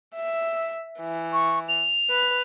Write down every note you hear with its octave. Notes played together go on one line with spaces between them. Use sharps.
E5
E3
C#6
F7
B4